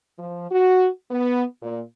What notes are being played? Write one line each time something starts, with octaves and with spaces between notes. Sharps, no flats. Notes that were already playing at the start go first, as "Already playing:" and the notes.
F3
F#4
B3
A#2